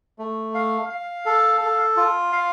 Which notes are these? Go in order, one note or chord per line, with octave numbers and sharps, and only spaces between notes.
A3
F5
F5
A4
A4
F4
F5